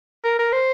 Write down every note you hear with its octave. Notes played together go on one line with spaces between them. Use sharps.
A#4
A#4
C5